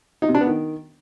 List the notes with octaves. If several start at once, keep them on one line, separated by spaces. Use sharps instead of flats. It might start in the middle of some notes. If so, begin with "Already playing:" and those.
D#4
C3
D4
B3
D#3